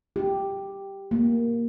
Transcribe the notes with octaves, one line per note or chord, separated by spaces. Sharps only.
G4
A#3